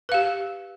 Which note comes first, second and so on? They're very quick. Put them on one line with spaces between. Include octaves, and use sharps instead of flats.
B4 F5 G4